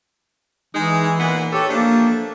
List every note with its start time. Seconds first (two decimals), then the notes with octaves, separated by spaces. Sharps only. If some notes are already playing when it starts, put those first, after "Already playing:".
0.75 E3 G#3 D#4
1.20 A#2 B3 F#5
1.53 G4 A4 C#5
1.69 F3 A3 A#3 D4